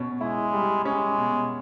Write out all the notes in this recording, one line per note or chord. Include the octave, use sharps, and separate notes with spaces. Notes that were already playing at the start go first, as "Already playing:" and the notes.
Already playing: B2 C#4
G#3 E4
G3
G#3 C#4
B2